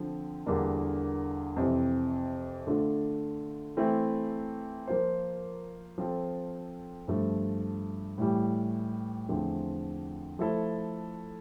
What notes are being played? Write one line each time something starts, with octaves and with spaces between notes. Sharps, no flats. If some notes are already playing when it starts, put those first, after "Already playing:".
Already playing: D3 F3 C4
E2 D3 G3 A#3 D4
F2 C3 E3
D3 A3 D4 F4 A4
E3 A3 C4 E4
F3 A#3 F4 C5
F3 C4 F4 A4
G2 F3 A3
A2 E3 G3
E2 D3 F3 A3 C4
F3 A3 E4 A4